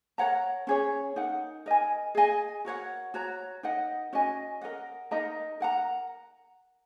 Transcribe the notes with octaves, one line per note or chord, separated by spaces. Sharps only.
A#4 C#5 F#5 A#5
C#4 G#4 C#5
D#4 A#4 F#5
A#4 D#5 G#5
G#4 D#5 G#5
F#4 A#4 C#5 F#5
F#4 C#5 A#5
D#4 A#4 D#5 F#5
C#4 F#4 D#5 G#5
A#4 D#5 F#5
D#4 A#4 D#5 A#5
A#4 F#5 A#5